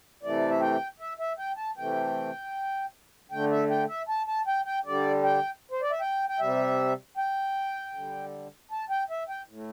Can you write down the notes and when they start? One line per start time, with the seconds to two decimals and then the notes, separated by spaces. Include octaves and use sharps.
0.23 C3 E3 A3 D5
0.49 E5
0.61 G5
1.00 E5
1.19 E5
1.39 G5
1.57 A5
1.77 C3 E3 A3 G5
3.31 D3 A3 G5
3.51 E5
3.70 G5
3.89 E5
4.09 A5
4.28 A5
4.47 G5
4.66 G5
4.85 D3 G3 D5
5.23 G5
5.71 C5
5.82 D5
5.91 E5
6.00 G5
6.29 G5
6.39 C3 G3 E5
7.17 G5
7.94 D3 G3
8.71 A5
8.90 G5
9.10 E5
9.29 G5
9.47 A2
9.53 A3